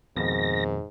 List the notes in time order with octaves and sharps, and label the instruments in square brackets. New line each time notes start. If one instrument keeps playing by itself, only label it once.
[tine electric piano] F2 B2 D#3 [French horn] G#2 [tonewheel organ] A#6